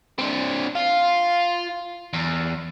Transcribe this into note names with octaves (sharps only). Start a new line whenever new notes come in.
C4 D4
F4
E2